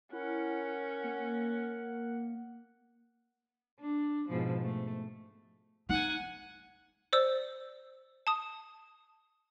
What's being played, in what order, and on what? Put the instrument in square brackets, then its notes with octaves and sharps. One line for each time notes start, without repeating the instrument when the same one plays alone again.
[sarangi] C#4 [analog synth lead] E4 [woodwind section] A#4 F#5
[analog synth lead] A#3
[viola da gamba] D4
G#2 B2 F3
A3
[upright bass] D#4 [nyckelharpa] F#5 G#5
[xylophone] C5 D5 E6
A5 D#6